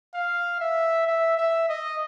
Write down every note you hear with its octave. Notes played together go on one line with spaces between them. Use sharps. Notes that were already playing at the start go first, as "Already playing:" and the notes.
F5
E5
E5
E5
D#5